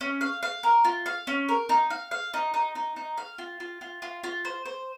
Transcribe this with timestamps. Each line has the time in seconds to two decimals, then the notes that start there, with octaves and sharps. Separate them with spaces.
0.01 C#4
0.21 F5
0.43 F5
0.63 A#4
0.84 F4
1.06 F5
1.27 C#4
1.49 A#4
1.69 D#4
1.90 F5
2.11 F5
2.34 D#4
2.54 D#4
2.75 D#4
2.96 D#4
3.17 F5
3.38 F4
3.60 F4
3.81 F4
4.02 F4
4.24 F4
4.45 C5
4.66 C5